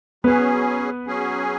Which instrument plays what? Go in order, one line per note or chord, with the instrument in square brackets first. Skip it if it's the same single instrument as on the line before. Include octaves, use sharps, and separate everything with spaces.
[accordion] F#3 C#4 G#4 [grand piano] B3 B4
[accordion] F#3 C#4 G#4